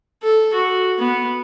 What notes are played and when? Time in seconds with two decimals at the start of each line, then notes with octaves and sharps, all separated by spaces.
0.23 A4
0.53 F#4
0.98 B3